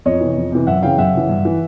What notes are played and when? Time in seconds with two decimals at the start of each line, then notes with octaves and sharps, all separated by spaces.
0.05 F2 C#5 D#5
0.21 C3 E3
0.37 F2
0.52 C3 E3
0.67 F#2 E5 F#5
0.83 C#3 E3 F5 G5
0.98 F#2 E5 F#5
1.14 C#3 E3
1.29 G2
1.45 E3